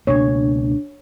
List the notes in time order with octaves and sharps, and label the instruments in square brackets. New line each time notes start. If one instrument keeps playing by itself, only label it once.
[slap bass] C#2 B2 A#3 [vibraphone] D4 [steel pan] C#5